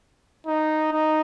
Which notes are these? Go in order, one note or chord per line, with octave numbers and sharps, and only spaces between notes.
D#4
D#4